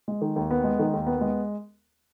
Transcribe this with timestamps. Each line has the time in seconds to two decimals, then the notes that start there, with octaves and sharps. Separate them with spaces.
0.08 G#3
0.22 D#3
0.36 D#2
0.51 B3
0.64 G#3
0.79 D#3
0.93 D#2
1.07 B3
1.21 G#3